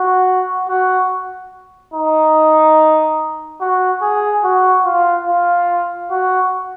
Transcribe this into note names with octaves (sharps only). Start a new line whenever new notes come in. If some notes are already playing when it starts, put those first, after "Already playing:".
Already playing: F#4
F#4
D#4
F#4
G#4
F#4
F4
F4
F#4